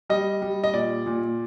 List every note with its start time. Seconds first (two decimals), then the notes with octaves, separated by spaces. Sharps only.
0.10 G3 D#5
0.42 G3
0.64 D#5
0.74 A#2 D5
1.06 A#2